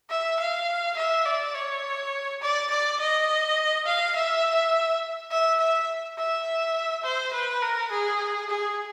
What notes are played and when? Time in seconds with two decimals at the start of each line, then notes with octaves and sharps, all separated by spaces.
0.10 E5
0.40 F5
0.97 E5
1.26 D5
1.55 C#5
2.42 D5
2.71 D5
3.00 D#5
3.86 F5
4.16 E5
5.31 E5
5.60 E5
6.18 E5
7.04 C5
7.33 B4
7.62 A#4
7.91 G#4
8.50 G#4